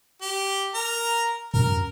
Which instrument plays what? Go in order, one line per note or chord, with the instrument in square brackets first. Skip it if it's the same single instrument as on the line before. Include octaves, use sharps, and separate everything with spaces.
[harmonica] G4
A#4 A#5
[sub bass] F#2 [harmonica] A#4